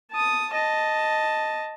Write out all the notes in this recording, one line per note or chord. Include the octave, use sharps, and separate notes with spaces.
A5 D#6
D#5 A5